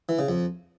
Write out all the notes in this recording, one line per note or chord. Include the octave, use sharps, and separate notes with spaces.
E3
C#3
F2